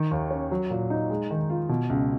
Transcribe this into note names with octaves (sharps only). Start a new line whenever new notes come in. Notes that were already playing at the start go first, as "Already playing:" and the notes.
Already playing: D#3
D#2
C#4
F#3
A#2
D#4
G#3
D#3
F4
B2
C#2